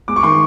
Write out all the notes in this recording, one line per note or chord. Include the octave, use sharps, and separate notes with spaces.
G#3 D6
C#6
D#3 C6